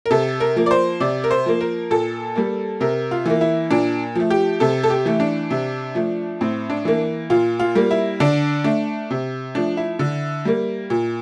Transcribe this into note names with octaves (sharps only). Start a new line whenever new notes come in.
A#4
C3 A4
A#4
F3 A#3
D5
C5
C3 D5
A#4
C5
F3 A#3
A#4
A#2 A4
G3 A#3
C3 A#4
F4
E3 A#3
E4
A#2 D4
F3 A3
G4
C3 A4
A4
G4
E3 A3
D4
C3
F3 A3
A2 C4
D4
E3 A#3
A#2 F4
F4
G3 A#3
E4
D3 D4
A3 D4
C3
F3 A3 D4
E4
D3
G3 A#3
A#2